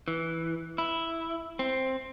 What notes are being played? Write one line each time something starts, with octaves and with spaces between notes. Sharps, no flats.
E3
E4
C4